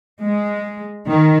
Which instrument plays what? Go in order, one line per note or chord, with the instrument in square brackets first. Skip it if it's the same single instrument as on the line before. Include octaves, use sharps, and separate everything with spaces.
[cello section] G#3
D#3